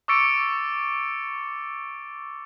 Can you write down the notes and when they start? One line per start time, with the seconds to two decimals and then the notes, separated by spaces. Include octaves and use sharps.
0.08 C#6 D6 E6 A6 C#7 D7